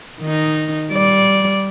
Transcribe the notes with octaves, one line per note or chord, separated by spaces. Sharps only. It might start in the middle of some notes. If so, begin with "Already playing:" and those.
D#3 D#4
G3 D5